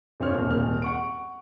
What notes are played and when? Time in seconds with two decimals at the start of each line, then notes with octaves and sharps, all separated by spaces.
0.20 G1 F3 C4 D4 C#5 F6
0.35 D#1
0.50 D#1 G#1 F6
0.82 F#5 C#6 D7